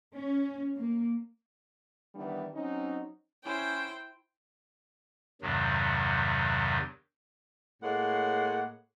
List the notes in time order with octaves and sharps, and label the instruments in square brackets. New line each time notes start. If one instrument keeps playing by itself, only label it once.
[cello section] C#4
A#3
[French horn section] D#3 E3 G3 B3 D4
F#3 C4 C#4 D#4
[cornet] C#4 [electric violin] E4 C5 [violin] G5
[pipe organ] E2 G2 C3 D#3 F#3
[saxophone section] A2 G#3 A#3 C#5 F#5